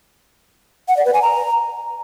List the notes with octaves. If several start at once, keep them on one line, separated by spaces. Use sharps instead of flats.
F#5
D5
B4
G#5
A#5